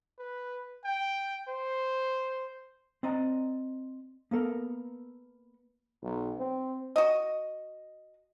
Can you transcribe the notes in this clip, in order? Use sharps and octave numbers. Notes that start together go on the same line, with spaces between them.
B4
G5
C5
C4 D5 D#5 A#5
A#3 B3 A4 A#4
B1
C4
F#4 D#5